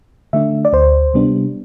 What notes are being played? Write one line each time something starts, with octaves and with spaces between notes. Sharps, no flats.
D3 A3 D4 E5
D5
D2 C5
C3 G3 B3 D4